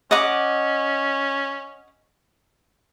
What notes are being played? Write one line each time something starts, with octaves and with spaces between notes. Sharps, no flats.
C#4 D#5 F#5 D6